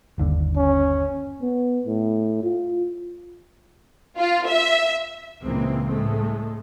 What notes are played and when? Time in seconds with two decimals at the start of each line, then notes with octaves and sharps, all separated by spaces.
0.18 G1 D#2 D3
0.56 C#4
1.42 B3
1.86 A2
2.43 F4
4.17 F4
4.49 E5
5.45 C#2 A#2 E3 G#3 A#3 C4
5.89 A2 G#3 A3